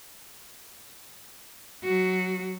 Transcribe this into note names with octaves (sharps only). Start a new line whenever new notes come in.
F#3 F#4